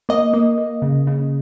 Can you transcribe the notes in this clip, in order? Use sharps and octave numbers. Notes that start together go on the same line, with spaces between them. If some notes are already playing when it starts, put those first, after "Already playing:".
A#3 D#5
A#3
A#3
C#3
C#3